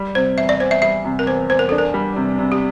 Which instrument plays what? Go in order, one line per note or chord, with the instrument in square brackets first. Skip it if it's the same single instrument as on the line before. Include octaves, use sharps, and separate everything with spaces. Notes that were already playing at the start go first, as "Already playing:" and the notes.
Already playing: [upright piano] G3
[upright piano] C3 [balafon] C5
[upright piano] E2 [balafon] E5
[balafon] D5
[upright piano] E2 [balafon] C5
[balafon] E5
[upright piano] G3 [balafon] E5
[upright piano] C3
[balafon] A#4
[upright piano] E2 [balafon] C5
[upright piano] E2 [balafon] C5
[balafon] A#4
[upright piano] D4 [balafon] A4
[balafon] A#4
[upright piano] G3
C3
C3
[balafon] G4